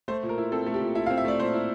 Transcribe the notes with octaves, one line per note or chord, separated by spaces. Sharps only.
A3 C5
A#2
A#4
E4
C4 A4
A3
G4
A#2
E4 E5
F5
C4
E5
A3 D5
A#2 C5
E4